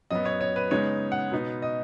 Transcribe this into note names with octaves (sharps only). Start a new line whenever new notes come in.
F#2 F#3 B3 D#5
C#5
C#5
B4
C#3 G#3 B3 D#4 C#5
F#5
B2 B3 D#4
D#5